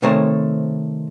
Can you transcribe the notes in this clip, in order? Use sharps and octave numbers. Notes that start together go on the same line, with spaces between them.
C3 D#3 A3 C5 C#5 A#5